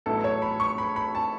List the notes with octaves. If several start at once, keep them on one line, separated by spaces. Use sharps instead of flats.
A1 A2 F#3 B3 E4 A4
C#5
B5
C#6
B5
B5
A5